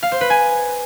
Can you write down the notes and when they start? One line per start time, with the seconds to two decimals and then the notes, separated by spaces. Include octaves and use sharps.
0.03 F5
0.12 C5
0.21 B4
0.30 G#5